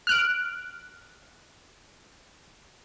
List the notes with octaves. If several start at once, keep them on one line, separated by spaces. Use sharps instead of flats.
F6 F#6 D7